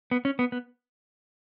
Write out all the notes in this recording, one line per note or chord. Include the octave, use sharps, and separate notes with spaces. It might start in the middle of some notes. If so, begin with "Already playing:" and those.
B3
C#4
B3
B3